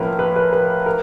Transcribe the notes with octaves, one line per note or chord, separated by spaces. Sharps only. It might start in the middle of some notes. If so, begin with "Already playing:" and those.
Already playing: A2 F3 A#3 C#4 A#4 B4
B4
B4
B4
A#4